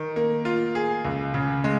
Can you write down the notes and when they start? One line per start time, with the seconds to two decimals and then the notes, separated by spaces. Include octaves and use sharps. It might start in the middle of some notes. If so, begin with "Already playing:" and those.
Already playing: D#3
0.16 A#3
0.45 F4
0.75 G#4
1.05 C#2
1.34 C#3
1.64 G#3